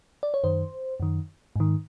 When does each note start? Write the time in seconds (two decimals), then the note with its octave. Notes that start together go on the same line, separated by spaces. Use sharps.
0.23 D5
0.34 C#5
0.44 F#2 D#3 C5
1.00 F#2 D#3
1.56 G#2 D#3